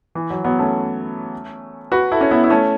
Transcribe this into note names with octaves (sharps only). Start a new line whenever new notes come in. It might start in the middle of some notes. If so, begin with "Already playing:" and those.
E3
F#3
F#3 B3
A3 C#4
F#4 B4
E4 A4
C#4
B3 E4
E4
A3 C#4